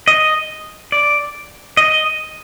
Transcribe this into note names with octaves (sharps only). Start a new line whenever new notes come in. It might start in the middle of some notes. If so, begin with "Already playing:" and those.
D#5
D5
D#5